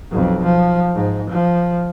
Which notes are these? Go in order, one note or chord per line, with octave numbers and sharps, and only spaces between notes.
B1 F2
F3
G#2
F3